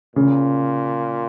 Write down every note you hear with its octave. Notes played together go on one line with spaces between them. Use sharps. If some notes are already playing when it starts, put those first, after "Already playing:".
A#2 C#3